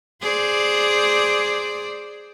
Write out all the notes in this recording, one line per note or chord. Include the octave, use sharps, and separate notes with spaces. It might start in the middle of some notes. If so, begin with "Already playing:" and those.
G#4 C5 D5